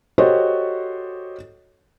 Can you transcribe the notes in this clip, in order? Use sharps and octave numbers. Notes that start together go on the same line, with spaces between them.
F#4 G4 A4 C5 C#5 D#5